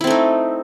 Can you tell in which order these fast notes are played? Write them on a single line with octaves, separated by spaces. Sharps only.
E4 C4 A3 D#4